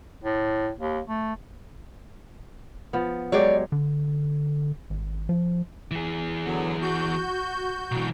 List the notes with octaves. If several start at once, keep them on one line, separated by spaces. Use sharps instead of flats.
A2
D#2
A3
F3 B3
F#3 G#3 G4 C#5 D5
D3
G#1
F3
E3 G#4
D3 F#3 B3
F#4 G6
B1 E3